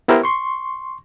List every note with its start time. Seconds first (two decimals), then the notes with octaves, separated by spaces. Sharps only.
0.08 B3 E4 G4 A#4 C5
0.23 C6 C#6